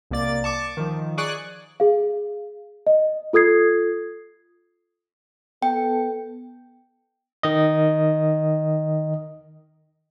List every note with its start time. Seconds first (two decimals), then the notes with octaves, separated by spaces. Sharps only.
0.11 C2 A#3 D5 A6
0.44 A5 C#6 D6
0.77 D#3 F3
1.18 G#4 D5 C#6 F#6
1.80 G#4 F5
2.87 D#5
3.33 F4 A4 D#6 G#6 C7
5.62 B3 A4 G5
7.43 D#3 D#5